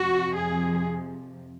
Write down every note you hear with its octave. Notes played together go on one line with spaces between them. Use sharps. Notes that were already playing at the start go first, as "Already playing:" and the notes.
Already playing: F2 C3 F3 F#4
G#4